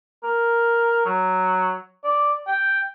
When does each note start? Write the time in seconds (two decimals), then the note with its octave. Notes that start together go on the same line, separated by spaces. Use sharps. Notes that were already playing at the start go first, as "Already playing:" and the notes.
0.24 A#4
1.06 F#3
2.04 D5
2.47 G5